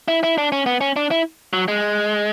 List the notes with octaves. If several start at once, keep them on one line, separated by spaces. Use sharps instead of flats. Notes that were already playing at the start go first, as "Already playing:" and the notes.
E4
E4
D4
C#4
B3
C#4
D4
E4
F#3
G#3